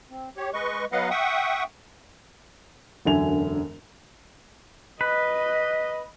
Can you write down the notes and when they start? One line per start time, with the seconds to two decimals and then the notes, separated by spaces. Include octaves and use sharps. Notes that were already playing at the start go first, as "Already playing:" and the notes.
0.10 C4
0.37 G4 C#5
0.53 G#3 B4 D#5 C#6
0.92 F#3 B3 B4 D#5 F5 F#5
1.10 E5 F#5 G5 C#6 D#6
3.05 E1 F#2 D3 E5 G#5 F7
5.01 B4 D#5